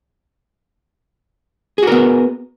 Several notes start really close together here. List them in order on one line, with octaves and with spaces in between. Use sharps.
G#4 F#4 A#4 B3